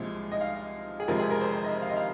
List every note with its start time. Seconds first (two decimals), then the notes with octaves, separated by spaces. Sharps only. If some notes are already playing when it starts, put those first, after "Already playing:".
Already playing: C2 A#2 F3 G#3
0.32 D#5
0.41 F5
1.00 G#4
1.08 F2 C3 F3 G#3 A#4
1.19 G#4
1.31 A#4
1.41 C5
1.53 C5
1.64 D#5
1.82 F5
1.90 D#5
1.97 F5